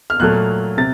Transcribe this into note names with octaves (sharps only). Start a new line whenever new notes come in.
F6
A#2 F#3 A3 F#6
C3 A6